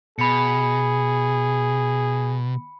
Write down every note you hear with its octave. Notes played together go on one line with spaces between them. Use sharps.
B2 G#4 B5 C#7